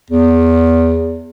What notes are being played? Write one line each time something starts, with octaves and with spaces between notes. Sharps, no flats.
E2